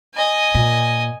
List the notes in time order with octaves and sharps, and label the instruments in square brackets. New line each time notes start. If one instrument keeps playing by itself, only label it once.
[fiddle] D#5 G#5
[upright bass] A#2